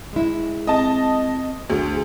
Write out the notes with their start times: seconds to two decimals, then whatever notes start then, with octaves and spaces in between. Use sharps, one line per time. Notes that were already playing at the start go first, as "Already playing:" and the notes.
0.13 G#3 E4
0.67 C4 D#5 A5
1.70 D2 G#4